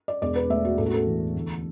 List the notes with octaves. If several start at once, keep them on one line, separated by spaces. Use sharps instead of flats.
D5
E1 D5
B4
A3 E5
F#4
A1 A4
F#4
A4
E3
D2